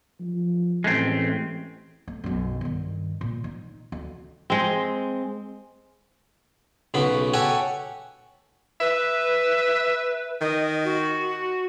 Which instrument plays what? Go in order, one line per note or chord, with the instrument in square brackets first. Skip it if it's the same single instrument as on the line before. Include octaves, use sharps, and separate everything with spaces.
[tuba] F3
[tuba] A1 [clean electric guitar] G#3 A3 C4
[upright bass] A3
B1 F#2
G2 D#3
A#2
D#4
D2
[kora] G#3 C4
[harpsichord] B1 C#3 B3 B5
G4 A4 C#5 F#5 G#5
[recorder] B4 [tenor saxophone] E5
[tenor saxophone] D#3 [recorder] D#5
[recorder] F#4